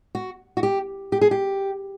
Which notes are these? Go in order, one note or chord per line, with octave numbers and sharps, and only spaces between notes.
F#4
F#4
G4
G4
G#4
G4